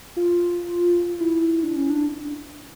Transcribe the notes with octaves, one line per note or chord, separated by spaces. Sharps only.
F4
E4
D4
C#4
D4